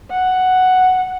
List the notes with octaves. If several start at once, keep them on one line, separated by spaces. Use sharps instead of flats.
F#5